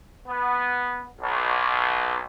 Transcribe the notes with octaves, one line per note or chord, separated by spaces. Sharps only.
B3
B1